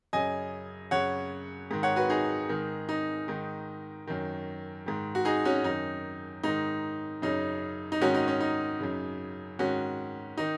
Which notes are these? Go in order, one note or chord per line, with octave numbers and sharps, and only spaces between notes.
F#2 C#3 D#5 G#5
F#2 C#3 C#5 F#5
G#2 D#3
C#5 F#5
F#4 B4
D#4 G#4
G#2 D#3
D#4
G#2 D#3
F#2 D#3
G#2 D#3
F#4
D#4 G#4
C#4 F#4
F#2 D#3 D#4
G#2 D#3 D#4
F#2 C#3 D#4
D#4
G#2 D#3 C#4 F#4
D#4
C#4
D#4
F#2 C#3
G#2 D#3 C#4 F#4
D#3 D#4